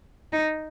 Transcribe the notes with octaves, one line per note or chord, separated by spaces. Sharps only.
D#4